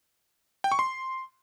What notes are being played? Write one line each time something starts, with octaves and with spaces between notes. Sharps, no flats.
G5
C#6
C6